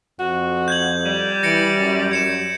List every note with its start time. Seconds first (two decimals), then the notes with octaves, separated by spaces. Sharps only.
0.19 F2 F#4
0.68 G6 G#6 F#7
1.05 G3
1.43 E3 A#6 C#7 D7
1.78 F#2
2.11 F#2 G#6 C#7 E7